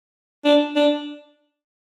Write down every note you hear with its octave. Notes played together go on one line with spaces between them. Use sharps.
D4
D4